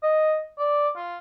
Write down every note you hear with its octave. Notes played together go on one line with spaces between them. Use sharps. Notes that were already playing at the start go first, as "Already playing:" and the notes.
D#5
D5
F4